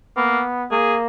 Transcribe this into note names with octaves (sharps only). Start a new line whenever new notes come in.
A#3 B3
A#3 G#4